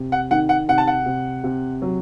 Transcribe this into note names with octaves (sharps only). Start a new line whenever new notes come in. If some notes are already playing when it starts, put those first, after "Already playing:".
Already playing: C3
F#5
D#3 F#5
F#5
C3 F#5
A5
F#5
C3
C3
F#3